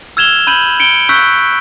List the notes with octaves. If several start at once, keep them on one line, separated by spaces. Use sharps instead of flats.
E6 F6 G#6 E7 F7 G7
B5 G6 D#7 F#7
C#7 D7 G7
C#6 E6 F#6 G6 B6